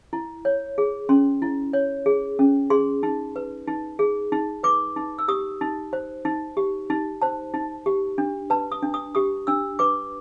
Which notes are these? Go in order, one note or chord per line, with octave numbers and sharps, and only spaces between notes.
E4
C#5
G#4
C#4 C6
E4
C#5
G#4
C#4
G#4 C6
D#4
B4
D#4
G#4
D#4
B4 D6
D#4
E6
G4 D#6
D#4
C5
D#4
G4
D#4
C5 A5
D#4
G4
D4
B4 A5
D#6
D4
D#6
G4 D#6
D4 E6
B4 D6